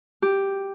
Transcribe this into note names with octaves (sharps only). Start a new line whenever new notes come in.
G4